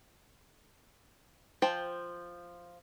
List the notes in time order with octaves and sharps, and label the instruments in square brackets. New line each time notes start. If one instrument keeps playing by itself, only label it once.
[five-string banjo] F3 C5 G5